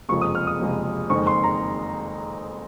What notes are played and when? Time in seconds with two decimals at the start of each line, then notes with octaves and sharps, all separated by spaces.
0.09 F#1 F2 C3 F3 G#3 C#6
0.21 D#6
0.35 F6
0.47 D#6
0.59 F#1 F2 C3 F3 G#3
1.09 F#1 F2 D#3 G#3 C4 C#6
1.27 C6
1.44 A#5